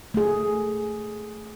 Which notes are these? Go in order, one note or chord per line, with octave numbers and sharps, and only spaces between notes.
A3 G#4